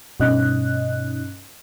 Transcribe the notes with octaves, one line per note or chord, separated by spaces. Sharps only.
G2 B2 C#4 D#4 D#5 F#6